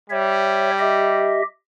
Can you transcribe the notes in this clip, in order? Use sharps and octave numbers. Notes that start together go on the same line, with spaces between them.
G3 C#5 E5
G4 D#5 E5